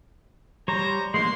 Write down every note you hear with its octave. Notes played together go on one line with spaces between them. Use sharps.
G3 C5 C#5 A#5
G#3 A#3 D4 C6